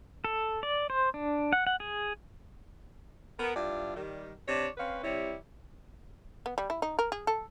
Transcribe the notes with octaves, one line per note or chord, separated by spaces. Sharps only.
A4
D5
C5
D4
F#5
F#5
G#4
B3 A#4
G2 E4 F4 D5
D#3 G3
C3 D4 C#5
C4 C#4 B4 F5
C3 G3 E4 C#5
B3
G3
E4
D#4
A#4
G#4
A4